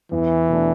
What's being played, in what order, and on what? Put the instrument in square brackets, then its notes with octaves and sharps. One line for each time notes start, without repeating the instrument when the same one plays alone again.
[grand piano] E2 [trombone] E3
[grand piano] B2 A3 D4